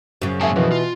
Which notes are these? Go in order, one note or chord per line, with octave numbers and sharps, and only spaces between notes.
F#2 C#3
G#2 A#3 G#4 E5 A5
B2 E3 F3 B3
F4